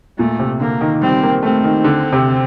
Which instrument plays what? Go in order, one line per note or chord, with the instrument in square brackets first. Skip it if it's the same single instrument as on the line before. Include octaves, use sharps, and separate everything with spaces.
[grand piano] A#2 [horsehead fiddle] A3
[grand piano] C3
[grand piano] D3 [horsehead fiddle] A#3
[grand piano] D#3
[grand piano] G3 [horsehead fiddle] C4
[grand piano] A#3
[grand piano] A3 [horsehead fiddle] C4
[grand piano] D#3
D3
C3